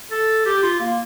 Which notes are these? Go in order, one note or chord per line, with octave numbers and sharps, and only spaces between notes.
A4
G4
F4
A#3